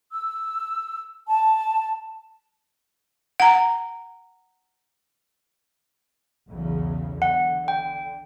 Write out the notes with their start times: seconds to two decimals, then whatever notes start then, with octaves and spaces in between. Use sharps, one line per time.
0.12 E6
1.28 A5
3.40 F#5 A#5
6.48 B1 E2 C#3
7.22 D3 F#5
7.68 G5